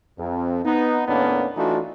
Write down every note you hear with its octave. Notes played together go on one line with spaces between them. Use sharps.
F2
B3 D#4
D#2 A2 A#3 B3 C#4 D4
E3 A3 D4 D#4 F4 F#4